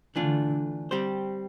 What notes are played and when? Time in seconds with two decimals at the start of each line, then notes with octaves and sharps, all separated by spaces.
0.16 D3 E3 A3 D4 F4
0.91 G3 C4 G4 C5